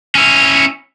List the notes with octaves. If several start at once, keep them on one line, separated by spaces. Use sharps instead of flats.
C#4 E4